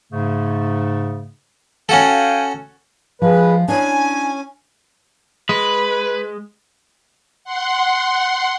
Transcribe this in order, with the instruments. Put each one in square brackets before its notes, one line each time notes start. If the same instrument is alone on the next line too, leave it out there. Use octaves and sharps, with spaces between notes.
[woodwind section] G#2 C#3 A3
[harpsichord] C#4 F#4 A4 [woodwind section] F5 G5 G#5
[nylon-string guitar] F3 [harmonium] G#3 B4
[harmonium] C#4 [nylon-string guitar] D4 E4 [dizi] G#5
[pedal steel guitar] G#3 [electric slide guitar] B4
[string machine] F#5 C6